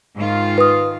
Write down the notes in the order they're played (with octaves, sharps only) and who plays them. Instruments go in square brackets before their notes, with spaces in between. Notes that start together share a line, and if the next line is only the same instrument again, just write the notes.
[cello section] G#2 D#3 F4
[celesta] B4 D#6